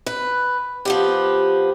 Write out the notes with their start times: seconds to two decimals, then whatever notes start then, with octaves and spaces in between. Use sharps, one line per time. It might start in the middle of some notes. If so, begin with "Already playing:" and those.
0.06 B4
0.85 F3 B3 G4